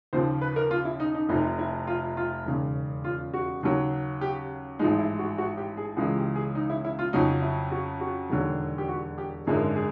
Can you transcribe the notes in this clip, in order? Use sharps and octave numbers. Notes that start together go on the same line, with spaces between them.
D#2 C#3 F3 C5
B4
A#4
F4
E4
D#4
D#4
F1 F2 C3 D#4
E4
F4
F4
E1 D#2 C#3
F4
F#4
D#2 C#3 F#3
G4
A1 G#2 F3 G#3 D#4
E4
F#4
F#4
G4
G#4
C#2 C#3 E3 G#3 G#4
G4
G#4
D#4
E4
E4
F4
F2 C#3 F#3 D#4
E4
F#4
F#4
E1 D#2 D3 F#3
G4
F#4
G4
G#1 F#2 D3 F3 G#3 G#4
G#4